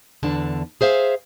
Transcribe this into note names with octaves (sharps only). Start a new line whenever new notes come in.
E2 D3 D4 A5
G#4 C5 E5 F5